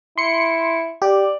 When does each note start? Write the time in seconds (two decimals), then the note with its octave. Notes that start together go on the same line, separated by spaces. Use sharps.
0.18 E4 C6 C#7
1.02 G4 D5